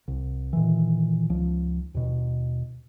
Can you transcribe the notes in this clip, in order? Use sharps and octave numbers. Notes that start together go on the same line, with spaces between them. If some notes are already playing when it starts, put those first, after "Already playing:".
C2
A#2 D#3 E3
C#2 F3
D#2 B2